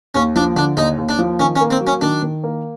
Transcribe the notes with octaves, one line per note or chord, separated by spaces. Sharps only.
D#2 C#4
F3 D4
D3 D4
D#2 D#4
D#2
D4
F3
D#3 C#4
C#4
A#3
C4
F#3
C#4
D#3 D4
D#3
A#3